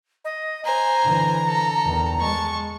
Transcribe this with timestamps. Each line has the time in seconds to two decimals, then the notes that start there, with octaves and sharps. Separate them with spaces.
0.25 D#5
0.65 C5 G#5 A#5
1.04 D3 E3
1.46 A4
1.84 E2 D#3
2.20 G#3 A5 C#6